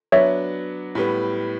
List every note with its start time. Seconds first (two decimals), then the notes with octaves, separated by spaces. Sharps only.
0.12 F#3 B3 D4 C#5 E5
0.95 A2 G3 B3